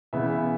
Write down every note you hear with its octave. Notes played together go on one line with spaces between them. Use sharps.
C#3 E3 B3 E5